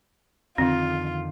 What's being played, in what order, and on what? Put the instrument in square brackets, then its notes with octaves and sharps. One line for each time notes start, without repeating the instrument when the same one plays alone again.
[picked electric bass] F2 D3 D#3 [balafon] C4 [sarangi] F4